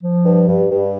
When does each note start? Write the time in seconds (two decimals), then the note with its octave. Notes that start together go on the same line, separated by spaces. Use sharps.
0.02 F3
0.25 G2
0.48 G2
0.71 G2